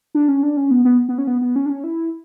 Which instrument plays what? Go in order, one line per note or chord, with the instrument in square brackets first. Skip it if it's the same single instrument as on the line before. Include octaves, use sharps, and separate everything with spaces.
[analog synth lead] D4
C#4
D4
C#4
B3
B3
B3
C#4
B3
B3
C#4
D4
C#4
E4